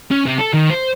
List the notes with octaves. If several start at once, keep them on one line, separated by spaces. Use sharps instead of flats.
C#4
C3
A4
D#3
C5